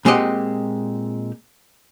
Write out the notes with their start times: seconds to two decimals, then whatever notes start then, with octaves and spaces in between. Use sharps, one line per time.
0.05 A#2 G#3 C4 G4 D#5 F#5